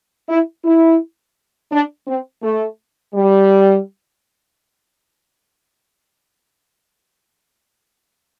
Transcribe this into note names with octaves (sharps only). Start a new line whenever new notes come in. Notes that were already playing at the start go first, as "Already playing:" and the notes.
E4
E4
D4
C4
A3
G3